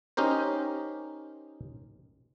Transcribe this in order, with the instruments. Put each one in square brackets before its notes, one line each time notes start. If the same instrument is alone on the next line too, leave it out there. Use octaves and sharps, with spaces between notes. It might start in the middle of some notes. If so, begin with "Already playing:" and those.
[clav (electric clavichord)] C#4 D#4 G4 A#4 C5